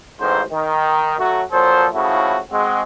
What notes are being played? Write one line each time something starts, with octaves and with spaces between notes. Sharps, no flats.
A1 G#2 C5
D#3
F#3 A3 F#4
A#2 F3 F#3 A4 C5
A2 C#3 F3 A3 E4 F#4
G#3 C4 F#4